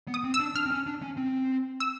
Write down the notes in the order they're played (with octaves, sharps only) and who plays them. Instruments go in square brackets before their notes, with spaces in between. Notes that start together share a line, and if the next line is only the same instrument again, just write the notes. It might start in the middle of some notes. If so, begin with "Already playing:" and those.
[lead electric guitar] B3
[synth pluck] D#6
[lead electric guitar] C4
[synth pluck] E6
[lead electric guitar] D4
[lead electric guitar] D4 [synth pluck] F6
[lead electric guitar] C4
C#4
D4
C#4
C4
[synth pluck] E6